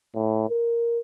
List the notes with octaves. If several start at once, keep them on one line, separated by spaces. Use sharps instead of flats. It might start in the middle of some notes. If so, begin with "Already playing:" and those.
A2
A#4